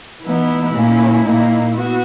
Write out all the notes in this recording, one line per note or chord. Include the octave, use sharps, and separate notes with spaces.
E3 B3 D#4 E4
A#2 A#3 C#4
A#2 A#3 D#4
B3 F#4